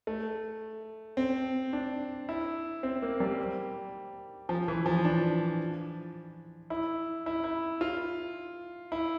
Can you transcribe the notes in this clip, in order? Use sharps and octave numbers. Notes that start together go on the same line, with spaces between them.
A3
C4
D4
E4
C4
A#3
G3
F3
E3
F3
D4
E4
E4
E4
F4
E4